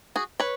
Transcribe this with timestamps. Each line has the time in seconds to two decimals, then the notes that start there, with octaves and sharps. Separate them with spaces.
0.16 F#4 G#4
0.40 B4 C#5